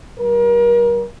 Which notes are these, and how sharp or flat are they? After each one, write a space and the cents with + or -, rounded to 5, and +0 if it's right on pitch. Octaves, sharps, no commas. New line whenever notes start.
G3 -30 A#4 +35